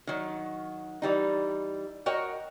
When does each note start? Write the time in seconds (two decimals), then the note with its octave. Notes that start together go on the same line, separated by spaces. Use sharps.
0.07 D#3 F#3
1.02 E3 G3 D#4
2.06 F#4 A#4 C#5 D#5 G5